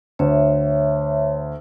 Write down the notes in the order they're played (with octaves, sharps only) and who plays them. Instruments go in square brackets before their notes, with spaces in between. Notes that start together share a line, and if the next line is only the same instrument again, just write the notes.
[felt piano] D2 [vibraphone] C#5 E5